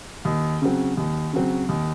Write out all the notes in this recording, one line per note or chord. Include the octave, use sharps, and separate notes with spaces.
D#2
C#3 F#3 C4
D#2
C#3 F#3 C4
D#2